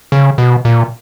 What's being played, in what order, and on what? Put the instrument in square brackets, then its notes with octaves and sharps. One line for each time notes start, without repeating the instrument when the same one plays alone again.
[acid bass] C#3
B2
A#2